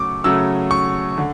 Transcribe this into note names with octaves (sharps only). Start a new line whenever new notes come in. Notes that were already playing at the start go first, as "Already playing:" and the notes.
Already playing: C#3 F#3 A3 C#6 D6
C#3 F#3 A3 E6
C#6
D3